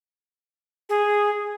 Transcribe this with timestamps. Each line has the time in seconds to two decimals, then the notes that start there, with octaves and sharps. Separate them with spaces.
0.89 G#4